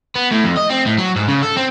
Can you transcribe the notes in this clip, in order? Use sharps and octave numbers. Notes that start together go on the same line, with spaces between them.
B3
A2
F2
D#5
C4
A2
F#3
G#2
C#3
A4
C4